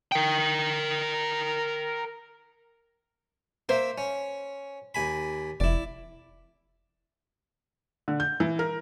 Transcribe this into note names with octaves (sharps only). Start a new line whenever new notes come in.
A#4 G5
A#3 C5 E5
C#4
D#2 G#5 B5
F1 E4 D5
D3
G6
E3
A#4